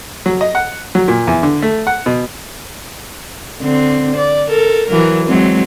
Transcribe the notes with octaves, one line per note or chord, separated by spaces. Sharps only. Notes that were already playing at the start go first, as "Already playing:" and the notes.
F#3
D#5
F#5
F#3
A#2
E2
D3
A3
F#5
B2
D3 C4
D5
A4 A#4
E3 F#3 A#4
F#3 G#3 C4